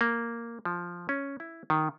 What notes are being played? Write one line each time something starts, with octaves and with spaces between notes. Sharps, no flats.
A#3
F3
C#4
E4
D#3